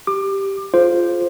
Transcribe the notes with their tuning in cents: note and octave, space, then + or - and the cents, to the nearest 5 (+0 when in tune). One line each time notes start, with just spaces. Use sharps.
G4 +0 D6 +25
F4 +0 G#4 +40 C5 +0